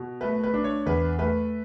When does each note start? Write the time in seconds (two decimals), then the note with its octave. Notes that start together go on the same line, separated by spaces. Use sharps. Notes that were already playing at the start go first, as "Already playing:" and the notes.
Already playing: B2
0.21 A3 B4
0.44 B4
0.54 D4
0.64 C#5
0.86 E2 B4
1.18 A3 B4